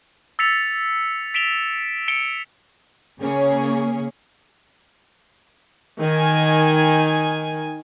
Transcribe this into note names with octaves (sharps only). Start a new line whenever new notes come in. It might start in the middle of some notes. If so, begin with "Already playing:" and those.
E6 A6 B6 C#7 F7
B6 D7 E7 F7 G7
C#7 D7 G7
C#3 A#3 C#4 G#4 C#5
D#3 G#5